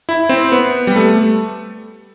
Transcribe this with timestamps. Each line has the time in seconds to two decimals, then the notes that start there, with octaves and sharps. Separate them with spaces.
0.09 E4
0.29 C4
0.52 B3
0.87 G3
0.96 A3